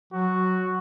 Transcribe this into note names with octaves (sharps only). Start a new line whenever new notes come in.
F#3 F#4